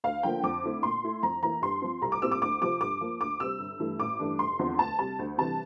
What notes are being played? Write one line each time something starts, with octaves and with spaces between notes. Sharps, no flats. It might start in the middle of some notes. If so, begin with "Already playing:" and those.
D2 F5
D3 F3 A#3 G5
F2 D6
D3 A3 C4 E4
A#2 C6
A3 E4
F2 A#5
E3 A#3 E4 A#5
G2 C6
F3 C4
C2 A#5
D6
A#2 G3 C4 E4 E6
D6
D2 D6
C3 F3 C4 D6
G2 D6
F3 A#3
D2 D6
C3 G3 C4 E6
G1
G2 E3 A3 E4
A1 D6
G2 E3 A3 D4
F1 C6
E2 D3 F3 C4
D2 A5
C3 G3 A5
D2
C3 E3 G3 A5